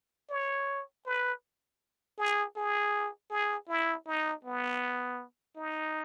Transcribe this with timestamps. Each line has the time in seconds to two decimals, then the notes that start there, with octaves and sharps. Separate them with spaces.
0.29 C#5
1.06 B4
2.18 G#4
2.56 G#4
3.31 G#4
3.69 E4
4.07 D#4
4.45 B3
5.56 D#4